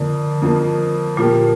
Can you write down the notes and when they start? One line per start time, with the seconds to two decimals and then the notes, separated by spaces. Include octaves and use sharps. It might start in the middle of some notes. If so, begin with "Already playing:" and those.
Already playing: F2 D3 F3 A#3
0.42 F2 F3 A#3
1.17 A#2 F3 A#3 G4